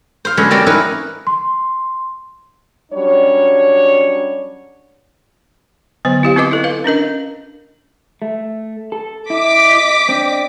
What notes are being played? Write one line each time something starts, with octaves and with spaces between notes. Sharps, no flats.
C5 F5
D3 F#3 G#3 B3 C#4
G3 A#3 C4 C#4 D5
C#4 D#4 E4 A#4 B4 C#5
C6
F#3 G3 C#4 D4 C#5
D3 F#3 B3 C5
E4 G4 F5
C4 F4 B4 D#5 D6
E4 A4
B4 F5
C#4 D4 A#4 D#5
A3
A4
E4 D#5 D6 B6
C4 D4